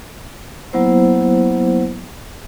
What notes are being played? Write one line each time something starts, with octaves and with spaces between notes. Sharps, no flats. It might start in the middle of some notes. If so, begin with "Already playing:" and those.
F#3 A#3 B3 E4 C5